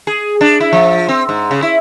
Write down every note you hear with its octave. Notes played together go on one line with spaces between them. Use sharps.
G#4
D4
E4
F3
C4
G#2
C#3
E4